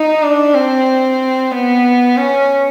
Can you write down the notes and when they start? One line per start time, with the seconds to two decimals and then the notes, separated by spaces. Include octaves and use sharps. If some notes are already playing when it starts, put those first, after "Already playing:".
Already playing: D#4
0.23 D4
0.54 C4
1.52 B3
2.17 C#4